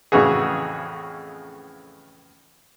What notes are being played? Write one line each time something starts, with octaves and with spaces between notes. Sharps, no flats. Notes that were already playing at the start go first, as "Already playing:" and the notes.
F2 A2 C#3 E3 F#4 G#4